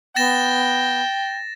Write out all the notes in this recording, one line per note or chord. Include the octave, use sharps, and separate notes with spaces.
B3 G5 A6 A#6 E7